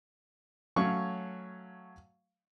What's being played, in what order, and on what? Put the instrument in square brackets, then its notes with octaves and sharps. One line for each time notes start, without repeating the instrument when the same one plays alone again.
[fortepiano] F#3 A3 C#4 F5 C#6